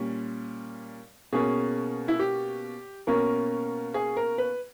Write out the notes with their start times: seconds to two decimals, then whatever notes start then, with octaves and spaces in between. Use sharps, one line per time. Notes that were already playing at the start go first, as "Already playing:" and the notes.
Already playing: A#2 G3 C#4
1.33 B2 A#3 C#4 G#4
2.08 E4
2.19 G4
3.07 B2 A#3 C#4 A#4
3.94 G#4
4.17 A#4
4.38 B4